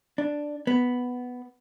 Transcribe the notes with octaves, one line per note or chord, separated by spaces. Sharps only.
D4
B3